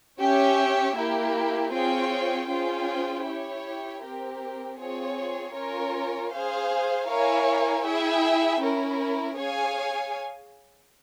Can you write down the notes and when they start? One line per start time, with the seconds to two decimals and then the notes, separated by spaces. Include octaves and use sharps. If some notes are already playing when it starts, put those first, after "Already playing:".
0.18 C#4 G4 C#5 E5
0.95 A#3 E4 G4
1.71 C4 F4 G#4 C#5 G5
2.48 C#4 F4 G#4 C5 G5
3.25 E4 G4 C#5
4.02 C4 G4 A#4
4.79 C4 F4 G#4 C#5
5.54 C#4 F4 A#4 C#5
6.31 G#4 C5 F5
7.08 E4 A#4 C#5 F5 G#5
7.85 E4 G#4 E5 G5
8.62 C#4 E4 A#4
9.37 G#4 C#5 F5 G#5